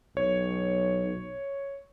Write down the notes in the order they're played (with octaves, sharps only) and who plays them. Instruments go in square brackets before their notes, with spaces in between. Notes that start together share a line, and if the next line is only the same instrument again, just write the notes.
[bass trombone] B1 [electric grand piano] C#5